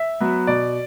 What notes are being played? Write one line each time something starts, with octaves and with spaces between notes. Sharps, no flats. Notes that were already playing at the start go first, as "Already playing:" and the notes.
Already playing: E5
F#3 B3
B2 D5